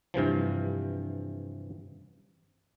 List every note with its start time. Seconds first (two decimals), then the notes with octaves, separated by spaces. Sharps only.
0.14 G2 C3 E3 F3